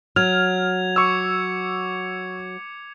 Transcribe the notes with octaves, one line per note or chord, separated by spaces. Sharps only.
F#3 F6 G#6 F7
C#6 D6 E6 C#7